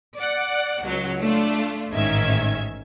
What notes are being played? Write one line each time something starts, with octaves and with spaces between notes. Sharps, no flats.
D5 F#5
C#2 F#3
A3 D4 F4
A1 G#2 D#3 C#4 E5 G#6